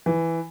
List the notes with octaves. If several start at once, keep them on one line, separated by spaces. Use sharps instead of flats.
E3